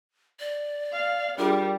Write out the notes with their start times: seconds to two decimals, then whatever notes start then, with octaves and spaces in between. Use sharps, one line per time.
0.40 D5
0.93 F5
1.38 G3 D4 F4 G#4 A#4